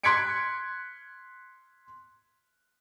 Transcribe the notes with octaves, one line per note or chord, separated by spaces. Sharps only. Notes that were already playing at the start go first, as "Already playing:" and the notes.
C6 F#6 G#6 B6 C#7 D7